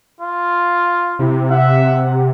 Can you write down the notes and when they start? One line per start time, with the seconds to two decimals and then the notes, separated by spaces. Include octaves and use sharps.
0.21 F4
1.19 C3 E4
1.50 E5 F#5